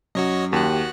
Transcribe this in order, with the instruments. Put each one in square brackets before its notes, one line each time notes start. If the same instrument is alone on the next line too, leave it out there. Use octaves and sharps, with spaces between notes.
[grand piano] F#2 [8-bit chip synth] F#4 C#5 D#5
[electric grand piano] D#2 [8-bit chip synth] F#4 F#6 [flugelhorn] G4